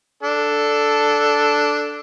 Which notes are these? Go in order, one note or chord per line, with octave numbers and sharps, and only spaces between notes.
D4 A4